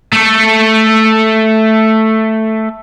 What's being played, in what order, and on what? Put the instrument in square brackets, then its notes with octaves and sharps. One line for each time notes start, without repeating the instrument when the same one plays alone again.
[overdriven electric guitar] A3 A4